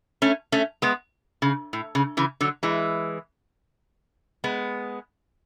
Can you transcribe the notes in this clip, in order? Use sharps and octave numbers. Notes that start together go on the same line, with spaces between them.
A3 C#4
A3 C#4
G#3 B3
C#3
A2
C#3
C#3 E3
D3 F#3
E3 G#3
G#3 B3